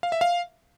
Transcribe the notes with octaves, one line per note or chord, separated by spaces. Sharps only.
F5
E5
F5